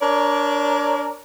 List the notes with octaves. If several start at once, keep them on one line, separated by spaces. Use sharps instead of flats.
D4 A#4 C#5 D5